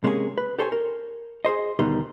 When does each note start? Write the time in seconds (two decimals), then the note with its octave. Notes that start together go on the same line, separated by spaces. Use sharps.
0.04 C3 G#3 A#3 C#4 E4 G#4
0.38 B4
0.59 G4 A4 C5 C#5 E5 G#5
0.72 A#4
1.45 G#4 A4 C5 D#5
1.79 D2 B2 D#3 G3 D#4 C6